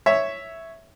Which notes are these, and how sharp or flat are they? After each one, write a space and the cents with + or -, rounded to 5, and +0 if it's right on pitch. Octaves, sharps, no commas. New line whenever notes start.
C#5 +0 E5 +0